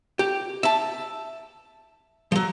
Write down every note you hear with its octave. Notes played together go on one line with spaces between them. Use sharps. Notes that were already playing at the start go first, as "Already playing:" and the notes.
G4
E5 A5
F3 F#3